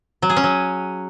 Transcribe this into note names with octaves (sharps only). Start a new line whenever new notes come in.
F#3
G#4
C#4
F#3